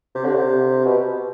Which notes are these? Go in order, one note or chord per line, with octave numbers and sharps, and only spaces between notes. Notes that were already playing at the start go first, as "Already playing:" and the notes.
C3
D3
C3
B2